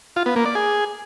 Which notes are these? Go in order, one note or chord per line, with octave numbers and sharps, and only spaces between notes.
F4
B3
A#3
D5
G#4